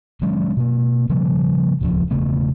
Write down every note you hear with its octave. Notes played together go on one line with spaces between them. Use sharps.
D#3 F#3 G#3 C#4
B2 A#3
C#3 F3 G3 A#3
D#1 C#2 D#3 F3
E1 C#3 A3 B3